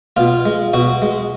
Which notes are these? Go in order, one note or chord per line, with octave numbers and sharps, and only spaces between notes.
B2 F4
G#3
B2 F#4
G#3